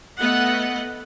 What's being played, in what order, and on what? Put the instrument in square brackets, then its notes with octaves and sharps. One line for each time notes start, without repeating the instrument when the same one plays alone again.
[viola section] A3 B3 D#5 F#5